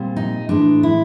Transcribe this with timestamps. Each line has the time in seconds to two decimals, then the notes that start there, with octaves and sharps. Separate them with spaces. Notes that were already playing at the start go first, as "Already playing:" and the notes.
Already playing: A#2 G3 C4
0.16 D#4
0.49 A2 E3 G#3 D4
0.83 E4